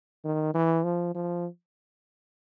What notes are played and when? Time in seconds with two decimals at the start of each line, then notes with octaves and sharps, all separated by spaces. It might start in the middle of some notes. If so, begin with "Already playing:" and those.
0.25 D#3
0.54 E3
0.84 F3
1.15 F3